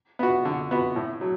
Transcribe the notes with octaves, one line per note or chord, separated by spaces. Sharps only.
B3 F#4
D3
B3 F#4
A2
F#3